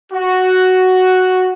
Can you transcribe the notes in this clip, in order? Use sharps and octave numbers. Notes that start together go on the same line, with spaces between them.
F#4